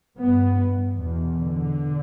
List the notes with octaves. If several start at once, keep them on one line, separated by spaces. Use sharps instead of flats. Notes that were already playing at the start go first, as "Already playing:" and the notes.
G2 B3
E2 B2
D3